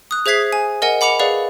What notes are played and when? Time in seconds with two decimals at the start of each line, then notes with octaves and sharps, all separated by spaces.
0.11 D#6 F#6
0.26 G#4 C5 E5 G#6 B6 C7
0.53 G#5
0.82 A#4 D#5 F#5 G#5
1.01 F#5 B5 D6 C#7 F7
1.19 G#4 B4 D5 F5